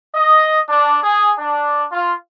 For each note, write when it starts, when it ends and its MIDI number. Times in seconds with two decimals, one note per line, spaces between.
0.15 0.59 75
0.69 0.98 62
1.02 1.31 68
1.38 1.86 62
1.92 2.13 65